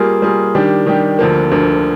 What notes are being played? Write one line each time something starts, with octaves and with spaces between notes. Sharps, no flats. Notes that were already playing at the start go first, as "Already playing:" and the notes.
Already playing: G3 A#3 F4 G#4
G3 A#3 F4 G#4
D#3 G3 D4 G4
D#3 G3 D4 G4
D2 D3 F3 A#3
D2 D3 F3 A#3